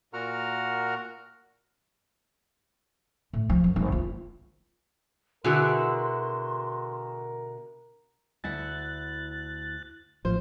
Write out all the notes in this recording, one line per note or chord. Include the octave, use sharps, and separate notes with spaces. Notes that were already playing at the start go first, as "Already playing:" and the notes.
A#2 F#4 A#4 F#5 A#5 F6
A2
F3
F#2
G#1
F4
B2 D3 E4 F#4 G#4 A#4 C6
D2 E4 F#5 F#6 A6
A1 F3 F4 C5